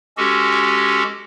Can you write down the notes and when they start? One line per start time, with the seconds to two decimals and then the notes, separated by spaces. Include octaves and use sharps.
0.17 G#3 C#4 F#4 G4 A4